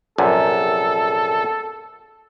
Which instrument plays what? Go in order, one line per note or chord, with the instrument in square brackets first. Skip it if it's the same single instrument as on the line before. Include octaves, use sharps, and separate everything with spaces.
[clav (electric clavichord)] A#1 F#2 C3 [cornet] A4